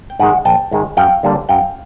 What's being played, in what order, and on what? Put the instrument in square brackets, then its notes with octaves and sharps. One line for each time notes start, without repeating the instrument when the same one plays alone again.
[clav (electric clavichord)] G5
G#2 D#3 G#3 F#5 G#5
A#1 G5 A5
G#2 D#3 G#3
F#2 F5 G5
D3 G3 A#3 D4
F#2 F5 G5